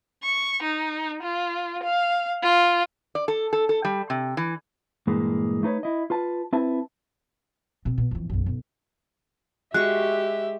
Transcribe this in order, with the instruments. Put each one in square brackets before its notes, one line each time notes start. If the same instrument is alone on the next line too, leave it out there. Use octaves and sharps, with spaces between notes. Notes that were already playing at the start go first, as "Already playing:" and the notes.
[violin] C#6
D#4
F4
F5
F4
[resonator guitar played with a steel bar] D5
A4
A4
A4
G3
C3
E3
[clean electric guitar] G2 A#2 E3 G#3 A#3
A3 D#4 B4 C#5
E4 D#5
F4 B4 A5
C4 E4 B4 E5 A5
[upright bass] B2 C4
B2
F2 E3
B1 F#2
B1 C#3
[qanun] G#3 F#4 C#6 [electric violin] G4 [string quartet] E5 [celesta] F#6